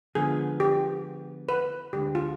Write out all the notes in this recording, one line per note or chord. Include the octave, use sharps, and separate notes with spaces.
D3 F3 G#3 B3 G#4
G4
B4
D2 D3 G#3 G4
F4